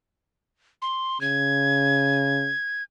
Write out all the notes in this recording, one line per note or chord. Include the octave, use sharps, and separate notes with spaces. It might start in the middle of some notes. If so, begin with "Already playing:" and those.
C6
C#3 G#6